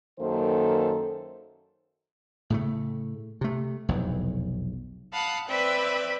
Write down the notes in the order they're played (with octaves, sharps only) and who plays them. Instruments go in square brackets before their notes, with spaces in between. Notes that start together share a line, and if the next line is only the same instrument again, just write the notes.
[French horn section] F#2 D#3 A#3 A4 C5
[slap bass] A2 C#3 A3
C3 A3
F1 B1 E2
[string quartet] F5 F#5 A5 B5 D#6 F#6
C4 B4 D5 E5 G5 B5